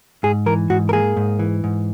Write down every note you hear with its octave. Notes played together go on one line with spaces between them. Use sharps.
G#2 G#4
E3 A#4
G#2 F#4
A#4
A#3 G#4
G#2
E3
G#2